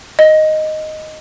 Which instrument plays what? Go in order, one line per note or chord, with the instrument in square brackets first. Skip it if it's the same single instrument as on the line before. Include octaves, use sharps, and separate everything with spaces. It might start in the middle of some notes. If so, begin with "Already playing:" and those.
[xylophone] D#5